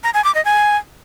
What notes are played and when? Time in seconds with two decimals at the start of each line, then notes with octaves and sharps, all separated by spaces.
0.04 A#5
0.14 G#5
0.24 D6
0.35 D#5
0.45 G#5